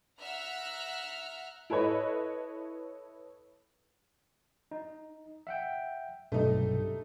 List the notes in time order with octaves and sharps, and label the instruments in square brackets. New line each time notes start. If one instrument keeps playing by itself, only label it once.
[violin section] E5 F#5 A#5 F6 F#6
[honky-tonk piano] E4 A4 B4 C#5 D#5
[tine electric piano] D#4
E5 F#5 G5
[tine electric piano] B1 G2 C3 [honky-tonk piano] A3 D#4